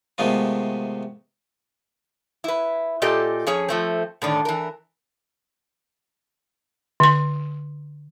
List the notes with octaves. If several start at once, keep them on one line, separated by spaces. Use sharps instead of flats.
C3 D#3 G#3 A3 B3 F4
E4 B4
A#2 F4 G4 A4 D#5
F2 C#4 G#4 C#5
F3 A3 C4
A2 D3 D#3 D4
E3 A#4
D3 C6